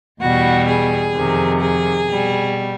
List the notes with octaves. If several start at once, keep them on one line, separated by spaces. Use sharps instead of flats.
E2 B2 G3 F#4
G#4
F2 C3 D#3
G#4
B2 G3